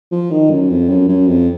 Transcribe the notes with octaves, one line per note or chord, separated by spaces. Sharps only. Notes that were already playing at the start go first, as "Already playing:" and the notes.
F3
D#3
F#2
F2
F#2
F#2
F2